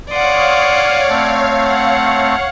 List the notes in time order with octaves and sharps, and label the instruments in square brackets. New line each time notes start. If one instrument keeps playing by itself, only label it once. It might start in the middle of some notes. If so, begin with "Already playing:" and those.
[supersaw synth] C#5 F5 [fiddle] D5 F#5 [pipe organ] C6 D#6
[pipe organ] A3 C4
[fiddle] F#5